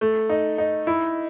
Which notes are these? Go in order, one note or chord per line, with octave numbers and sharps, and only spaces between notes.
A3
D#4
D#4
E4